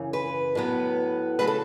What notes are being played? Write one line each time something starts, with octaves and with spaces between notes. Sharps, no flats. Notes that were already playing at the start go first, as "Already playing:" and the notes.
Already playing: F#2 C#3 E3
B4
A2 F#3 B3
C#3 F#3 A3 B4
A4